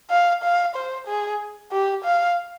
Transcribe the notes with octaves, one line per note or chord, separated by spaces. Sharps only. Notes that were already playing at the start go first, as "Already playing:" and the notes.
F5
F5
C5
G#4
G4
F5